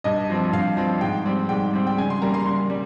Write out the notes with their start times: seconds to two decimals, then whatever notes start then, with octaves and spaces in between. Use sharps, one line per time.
0.04 G2 D#5
0.30 F3 C4
0.53 G2 F5
0.77 F3 C4
1.01 G#2 G5
1.26 G3 C4
1.49 G#2 G5
1.73 G3 C4
1.87 G5
1.97 C#3 G#5
2.10 C6
2.22 G3 A#3 A#5
2.34 C6
2.46 C#3 C6
2.70 G3